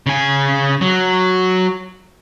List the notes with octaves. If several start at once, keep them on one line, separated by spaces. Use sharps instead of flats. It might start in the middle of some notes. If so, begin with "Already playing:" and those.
C#3 G#5
F#3